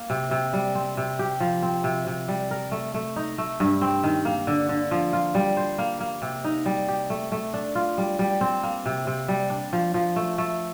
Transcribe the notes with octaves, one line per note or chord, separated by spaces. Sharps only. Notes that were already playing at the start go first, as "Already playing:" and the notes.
Already playing: A#3
C3
C3
G3
C4
C3
G4
F3
C4
C3
C3
G3
A#4
A3
A3
D#4
A3
G2
C4
D#3
A#3
D3
D3
F3
F4
G3
C5
A#3
A#3
C3
D#4
G3
G4
A3
A3
D4
F4
G3
G3
C4
A#3
C3
C3
G3
D4
F3
F3
A3
A3